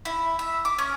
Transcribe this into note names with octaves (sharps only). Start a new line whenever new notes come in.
E4
E5
D6
C#4